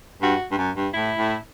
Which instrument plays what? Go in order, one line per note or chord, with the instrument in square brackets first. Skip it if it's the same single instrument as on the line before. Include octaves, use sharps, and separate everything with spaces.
[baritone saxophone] G2 [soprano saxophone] F#4
[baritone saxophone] G2
F#2
G2
[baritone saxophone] A2 [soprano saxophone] E4
[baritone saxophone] A2